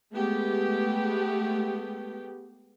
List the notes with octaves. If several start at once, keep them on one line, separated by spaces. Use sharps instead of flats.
G#3 A3 B3 G4